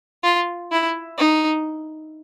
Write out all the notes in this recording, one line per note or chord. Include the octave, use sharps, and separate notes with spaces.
F4
E4
D#4